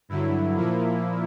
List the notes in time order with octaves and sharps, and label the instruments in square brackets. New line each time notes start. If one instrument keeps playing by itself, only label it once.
[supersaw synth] G2 D3 F#3 E4
A#2 F3 A#3